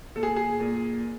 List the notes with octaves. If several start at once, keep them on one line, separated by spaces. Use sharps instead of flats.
A#2 A4
G#4
G#4
A#2